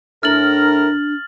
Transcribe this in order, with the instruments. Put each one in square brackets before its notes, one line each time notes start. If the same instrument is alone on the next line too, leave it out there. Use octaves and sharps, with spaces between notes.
[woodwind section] A2 A#4 [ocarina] D4 [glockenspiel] F6 A6 F#7